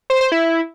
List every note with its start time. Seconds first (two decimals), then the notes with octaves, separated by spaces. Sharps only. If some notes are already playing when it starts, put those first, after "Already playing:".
0.10 C5
0.21 C5
0.32 E4